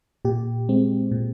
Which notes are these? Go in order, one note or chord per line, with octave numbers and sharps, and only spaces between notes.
A#2 G4
G#3 C4
A#2